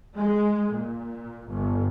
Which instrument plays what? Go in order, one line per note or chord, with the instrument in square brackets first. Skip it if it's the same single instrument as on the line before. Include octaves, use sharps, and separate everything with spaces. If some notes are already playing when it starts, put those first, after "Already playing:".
[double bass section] G#3
A#2
G1